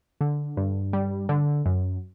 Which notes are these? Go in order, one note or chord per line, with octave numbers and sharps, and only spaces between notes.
D3
G2
G3
D3
F#2